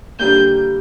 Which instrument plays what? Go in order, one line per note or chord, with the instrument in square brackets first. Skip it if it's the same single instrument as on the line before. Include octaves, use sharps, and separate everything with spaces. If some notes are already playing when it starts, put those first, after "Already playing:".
[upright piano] D3 G3 A#3 [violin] G6